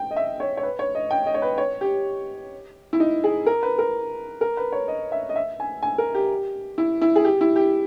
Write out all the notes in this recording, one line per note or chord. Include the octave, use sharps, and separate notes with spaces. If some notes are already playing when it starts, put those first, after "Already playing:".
Already playing: G5
D#5
E5
C#5
C#5
B4
C#5
D#5
G5
D#5
C#5
B4
C#5
G4
E4
D#4
G#4
A#4
B4
A#4
A#4
B4
C#5
D#5
E5
D#5
E5
G#5
G#5
A#4
G4
E4
E4
G#4
G4
E4
G4